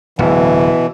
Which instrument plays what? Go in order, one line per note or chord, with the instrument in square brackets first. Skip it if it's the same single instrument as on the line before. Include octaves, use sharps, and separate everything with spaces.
[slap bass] D1 [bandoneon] B2 E3